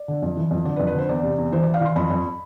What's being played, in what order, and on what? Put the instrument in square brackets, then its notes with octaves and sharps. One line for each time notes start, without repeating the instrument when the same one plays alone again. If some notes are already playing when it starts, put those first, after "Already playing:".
Already playing: [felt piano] D5
D3
F2
E3
F2
D3 D5
B4
F2
B4
D3 C5
E2 D5
C3
E2
E3 C5
E3 D5
F5
E3 C6
F2 B5
F2